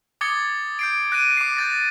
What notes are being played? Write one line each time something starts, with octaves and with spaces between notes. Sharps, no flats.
D6 D#6 G#6 A6 C#7 G7
G6 C7 D7
F#6 A#6 D7 D#7
D6 C7
G6 A6 A#6